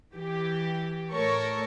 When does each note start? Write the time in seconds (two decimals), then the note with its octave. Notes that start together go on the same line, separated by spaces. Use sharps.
0.14 E3 G4
1.11 A2 A4 A#4 C#5 C#6